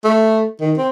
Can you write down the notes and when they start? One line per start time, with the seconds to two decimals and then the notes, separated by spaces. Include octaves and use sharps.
0.04 A3
0.60 D#3
0.77 C4